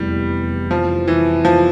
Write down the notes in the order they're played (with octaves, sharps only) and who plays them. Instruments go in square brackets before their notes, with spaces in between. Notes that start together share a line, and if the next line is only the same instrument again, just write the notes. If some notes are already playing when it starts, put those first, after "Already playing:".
Already playing: [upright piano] F1 E2 [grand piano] G3
[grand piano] F3
E3
F3